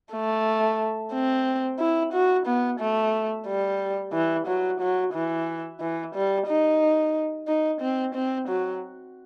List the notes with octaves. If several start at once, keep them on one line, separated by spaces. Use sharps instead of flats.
A3
C4
E4
F#4
B3
A3
G3
E3
F#3
F#3
E3
E3
G3
D#4
D#4
C4
C4
F#3